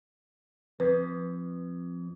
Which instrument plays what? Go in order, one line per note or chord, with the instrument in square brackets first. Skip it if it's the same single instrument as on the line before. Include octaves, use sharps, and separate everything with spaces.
[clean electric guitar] F2 [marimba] B4